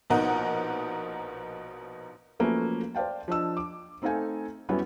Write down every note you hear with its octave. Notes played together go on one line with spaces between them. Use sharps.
A#1 B2 D#4 A#4 F#5
F3 F#3 A3 A#3 C#4 B4
C5 D5 F5 G5 A5
F3 D4 D#5 E6
D6
A3 C4 D#4 A4 F5 G#5
F#2 G3 B3 C#4 E4 F#4